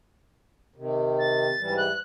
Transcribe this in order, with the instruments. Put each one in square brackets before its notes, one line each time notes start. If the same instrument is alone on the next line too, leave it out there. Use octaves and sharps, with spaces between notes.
[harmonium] C3 D#3
[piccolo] A6
[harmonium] G#2 E3 G3
[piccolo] F#6